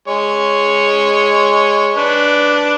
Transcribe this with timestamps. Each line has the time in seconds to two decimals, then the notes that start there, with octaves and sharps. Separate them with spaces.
0.08 G#3 C#5
1.95 D4 B4